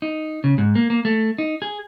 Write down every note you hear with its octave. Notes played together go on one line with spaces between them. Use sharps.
D#4
C#3
G#2
A#3
A#3
A3
D#4
G#4